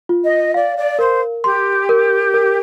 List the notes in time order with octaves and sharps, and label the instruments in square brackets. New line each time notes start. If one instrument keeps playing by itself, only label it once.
[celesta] F4
[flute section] D#5
[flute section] D5 [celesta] F5
[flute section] D5
[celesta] A#4 [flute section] C5
[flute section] G4 [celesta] C6
[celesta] A#4
A#4